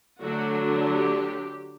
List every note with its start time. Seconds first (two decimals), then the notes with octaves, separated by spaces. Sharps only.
0.21 D3 F#3 A3 D4 F#4
0.92 G4